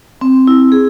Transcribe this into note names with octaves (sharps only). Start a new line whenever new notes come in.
C4
E4
G#4